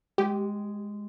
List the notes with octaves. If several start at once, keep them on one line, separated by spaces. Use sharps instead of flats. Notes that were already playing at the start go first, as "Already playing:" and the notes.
G#3 G4